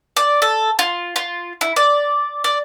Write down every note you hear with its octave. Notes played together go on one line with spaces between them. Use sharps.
D5
A4
F4
F4
E4
D5
D5